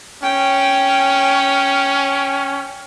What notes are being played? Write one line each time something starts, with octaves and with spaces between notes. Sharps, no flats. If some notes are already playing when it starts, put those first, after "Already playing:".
C#4 G5